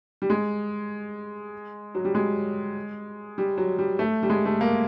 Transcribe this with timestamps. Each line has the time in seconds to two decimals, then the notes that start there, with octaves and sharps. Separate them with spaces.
0.22 G3
0.30 G#3
1.95 F#3
2.05 G3
2.15 G#3
3.38 G3
3.58 F#3
3.79 G3
3.99 A3
4.23 G3
4.30 G#3
4.45 A3
4.61 A#3